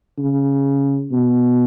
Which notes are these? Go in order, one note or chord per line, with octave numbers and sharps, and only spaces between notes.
C#3
B2